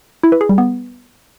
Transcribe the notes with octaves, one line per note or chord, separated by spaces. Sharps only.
E4
B4
G#4
G3
B3